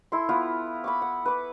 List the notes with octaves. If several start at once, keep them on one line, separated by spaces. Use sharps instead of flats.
E4 A4 C6
B3 E4 F4
B5 C#6 D6
F#5
B4 D6